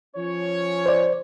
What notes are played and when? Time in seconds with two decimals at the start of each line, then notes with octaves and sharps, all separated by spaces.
0.16 F3 C#4 C#5
0.86 C5 D5